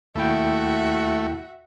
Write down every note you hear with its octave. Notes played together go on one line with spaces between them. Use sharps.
D#2 A3 E4 F#4 E5 G5